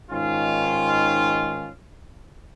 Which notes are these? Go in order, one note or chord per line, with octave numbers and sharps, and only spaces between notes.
G#2 D#3 C#4 F4